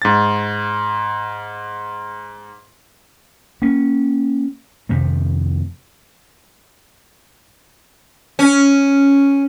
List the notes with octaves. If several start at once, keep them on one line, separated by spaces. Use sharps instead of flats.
G#2 A6
A#3 C#4
F2 C3 D#3 A3
C#4